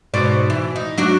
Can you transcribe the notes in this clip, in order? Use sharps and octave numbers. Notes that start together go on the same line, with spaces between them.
G#2 B2 D5
E3
D#4
F#3 D4 F#4